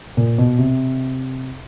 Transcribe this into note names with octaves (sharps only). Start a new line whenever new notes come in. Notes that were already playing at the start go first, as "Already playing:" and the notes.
A#2
B2
C3